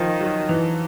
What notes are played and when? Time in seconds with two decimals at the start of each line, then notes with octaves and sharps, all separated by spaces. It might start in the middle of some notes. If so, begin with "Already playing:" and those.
Already playing: D#3 F3
0.21 F#3
0.49 E3